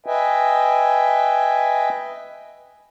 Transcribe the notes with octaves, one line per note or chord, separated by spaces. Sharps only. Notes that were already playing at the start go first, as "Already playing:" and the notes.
B4 D#5 E5 G5 G#5